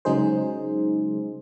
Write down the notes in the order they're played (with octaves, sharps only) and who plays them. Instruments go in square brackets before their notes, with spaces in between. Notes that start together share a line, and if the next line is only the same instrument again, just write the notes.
[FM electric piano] C#3 F#3 G#3 D#4 G#4 C5